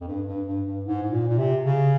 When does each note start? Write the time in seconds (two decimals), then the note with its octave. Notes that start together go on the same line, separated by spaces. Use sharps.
0.01 F2
0.08 G2
0.27 G2
0.47 G2
0.66 G2
0.86 G#2
1.03 G#2
1.11 A#2
1.29 A#2
1.38 C3
1.63 C#3